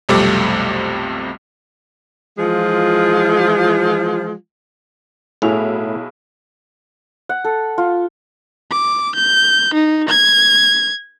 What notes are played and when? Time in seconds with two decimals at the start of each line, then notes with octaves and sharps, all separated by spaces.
0.09 B1 F2 C3 G3 A3 D6
2.37 E3 F3 G#3 F4
5.42 B1 A2 E4 F#4 G#4 F7
7.29 F#5
7.45 A4
7.78 F4
8.71 D6
9.15 G6
9.74 D#4
10.09 G#6